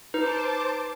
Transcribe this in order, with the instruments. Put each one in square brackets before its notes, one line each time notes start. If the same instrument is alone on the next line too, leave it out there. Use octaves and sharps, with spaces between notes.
[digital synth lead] D#4 [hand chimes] B4 [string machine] C5 A5 D6